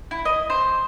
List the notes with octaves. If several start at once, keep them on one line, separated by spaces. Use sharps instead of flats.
E4
D#5
C5